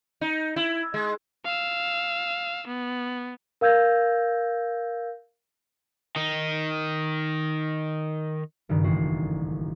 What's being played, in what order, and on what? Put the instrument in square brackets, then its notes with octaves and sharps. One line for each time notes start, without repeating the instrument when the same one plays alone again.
[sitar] D#4
E4
G#3
[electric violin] F5 E6
B3
[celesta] A#4 F5 E6 G6 G#6 A#6
[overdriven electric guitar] D#3 D#4
[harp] F#1 G2 D#3
A1 F#4 C7